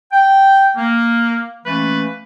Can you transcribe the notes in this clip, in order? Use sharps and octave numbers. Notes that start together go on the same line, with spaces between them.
G5
A#3
E3 A3 A#3 C#4 B4